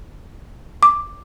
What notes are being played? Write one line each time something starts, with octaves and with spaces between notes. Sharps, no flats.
D6